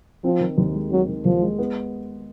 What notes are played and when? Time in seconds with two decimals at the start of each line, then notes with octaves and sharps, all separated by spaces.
0.24 F3 C4
0.41 D#3
0.58 D#2
0.75 G#3
0.91 F#3 C4
1.09 D#3
1.25 D#2 F3
1.42 G#3
1.58 B3